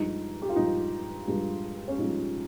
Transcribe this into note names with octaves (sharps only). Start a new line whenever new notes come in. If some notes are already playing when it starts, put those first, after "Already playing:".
Already playing: G2 F3 G#3 D#4
G4
F4
G2 F3 G#3 D#4
G2 F3 G#3
C#4
G2 F3 G#3 D#4